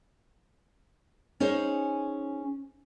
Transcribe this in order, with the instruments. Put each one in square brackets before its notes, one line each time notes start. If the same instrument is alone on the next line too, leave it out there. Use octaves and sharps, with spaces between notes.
[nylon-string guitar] C#4 D#4 G#4 C5 C#5